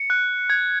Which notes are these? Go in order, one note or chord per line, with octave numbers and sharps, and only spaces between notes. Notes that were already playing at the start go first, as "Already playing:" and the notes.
Already playing: C#7
F#6
G#6